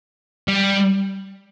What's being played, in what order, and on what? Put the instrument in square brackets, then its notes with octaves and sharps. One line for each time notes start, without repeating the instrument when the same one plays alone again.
[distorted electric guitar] G3